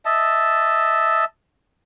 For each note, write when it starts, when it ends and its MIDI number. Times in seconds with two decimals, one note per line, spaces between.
0.05 1.25 75
0.05 1.25 76
0.05 1.25 81